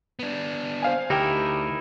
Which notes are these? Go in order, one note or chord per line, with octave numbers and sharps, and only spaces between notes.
B3 D4
C5 F5 G#5
D2 D#4 E4 G4 A#4 G5